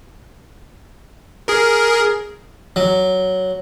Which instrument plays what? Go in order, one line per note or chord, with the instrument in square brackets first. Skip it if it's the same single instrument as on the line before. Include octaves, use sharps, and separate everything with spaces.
[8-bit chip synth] G#4 A#4
[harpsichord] F#3